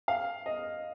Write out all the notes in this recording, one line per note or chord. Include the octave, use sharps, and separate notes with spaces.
F5
D#5